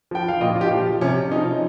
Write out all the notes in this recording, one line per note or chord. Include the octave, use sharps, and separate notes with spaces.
F3 G5
F5
A#2 D#5
F4
G4
F3
C3 C#4
F3 D#4